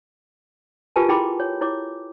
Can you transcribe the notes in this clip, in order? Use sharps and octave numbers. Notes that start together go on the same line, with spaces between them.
F4 G4 A#4 B4 G#5 A5
E4 G#4 G5 B5 C6 D6
C#5
E4 C#5 D6